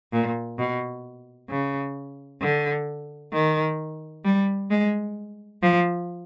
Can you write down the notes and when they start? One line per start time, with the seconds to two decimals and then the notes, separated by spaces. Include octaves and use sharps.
0.13 A#2
0.59 B2
1.50 C#3
2.42 D3
3.33 D#3
4.25 G3
4.71 G#3
5.62 F3